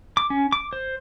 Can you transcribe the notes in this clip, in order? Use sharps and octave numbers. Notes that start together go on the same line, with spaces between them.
D6
C#4
D6
C5